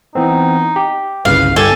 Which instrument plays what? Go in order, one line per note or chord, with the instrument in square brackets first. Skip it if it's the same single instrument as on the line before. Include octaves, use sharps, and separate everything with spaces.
[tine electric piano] E3 B3 C4 [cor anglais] D#4
[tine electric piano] G4
[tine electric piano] G1 C2 C#3 [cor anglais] B4 [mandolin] F5
[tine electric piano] G1 [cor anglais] G4 [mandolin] A4 G#5